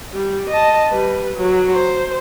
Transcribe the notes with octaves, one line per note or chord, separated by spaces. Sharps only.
G3
D#5 A5
G3 B4
F#3
C5